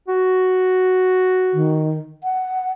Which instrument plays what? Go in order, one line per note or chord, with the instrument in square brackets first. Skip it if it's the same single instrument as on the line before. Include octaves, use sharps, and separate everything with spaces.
[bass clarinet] F#4
[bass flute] D#3
F#5